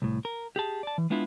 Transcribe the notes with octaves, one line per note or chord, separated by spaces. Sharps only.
C2 A2
A#4
G4 G#4 A5
D5 A5
E3
G#3 B3 D4 E4 F4